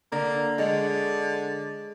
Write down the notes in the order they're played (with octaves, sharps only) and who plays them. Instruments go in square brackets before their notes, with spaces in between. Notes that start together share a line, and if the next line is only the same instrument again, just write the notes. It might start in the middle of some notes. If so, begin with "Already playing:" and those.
[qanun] D3 [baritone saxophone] A#3
[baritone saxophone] D3 [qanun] G#3 C#5 F#5